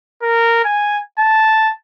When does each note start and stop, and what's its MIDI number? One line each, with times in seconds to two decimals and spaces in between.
0.23 0.61 70
0.65 0.99 80
1.19 1.72 81